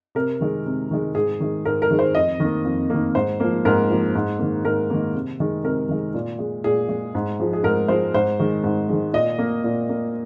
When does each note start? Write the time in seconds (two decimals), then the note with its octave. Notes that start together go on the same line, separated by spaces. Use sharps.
0.15 C3 A#4
0.41 D#3 G#3
0.66 C3
0.91 D#3 G#3
1.15 G#2 G#4
1.40 D#3 G#3
1.65 G#2 A#4
1.82 A#4
1.91 D#3 G#3
1.99 C5
2.15 F2 D#5
2.40 D#3 A#3
2.65 F2
2.90 D#3 A#3
3.15 G#2 C5
3.40 F3 A#3
3.65 G#2 A#4
3.90 F3 A#3
4.15 G#2
4.39 D#3 A#3
4.65 G#2 A#4
4.90 D#3 A#3
5.14 C3
5.40 D#3 G#3
5.64 C3 A#4
5.89 D#3 G#3
6.14 A#2
6.39 G#3
6.64 A#2 G#4
6.89 G#3
7.15 G#2
7.40 F3 G#3
7.53 G#4
7.64 G#2 A#4
7.88 F3 G#3 C5
8.14 G#2 C5
8.39 D#3 G#3
8.64 G#2
8.89 D#3 G#3
9.13 A#2 D#5
9.39 A#3
9.64 A#2
9.89 A#3